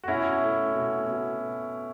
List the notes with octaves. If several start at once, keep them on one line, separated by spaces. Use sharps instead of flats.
F#4
B2 C#4 E4
A3
B2
B2